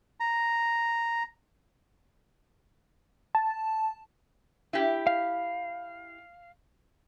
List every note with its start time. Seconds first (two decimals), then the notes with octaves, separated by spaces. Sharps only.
0.20 A#5
3.35 A5
4.73 E4 G4
5.07 F5